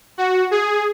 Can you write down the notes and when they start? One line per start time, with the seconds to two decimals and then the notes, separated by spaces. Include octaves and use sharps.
0.18 F#4
0.51 G#4